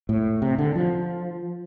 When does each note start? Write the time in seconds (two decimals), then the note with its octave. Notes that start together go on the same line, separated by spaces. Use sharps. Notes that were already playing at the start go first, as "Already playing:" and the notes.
0.09 A2
0.42 C3
0.58 D3
0.75 F3